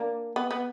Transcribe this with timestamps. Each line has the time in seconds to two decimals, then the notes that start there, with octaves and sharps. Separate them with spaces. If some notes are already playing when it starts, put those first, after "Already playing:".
Already playing: A#3 D4
0.36 B3
0.51 B3